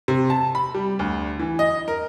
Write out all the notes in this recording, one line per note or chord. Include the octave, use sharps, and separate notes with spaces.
C3
A5
B5
G3
D2
E3
D#5
A#4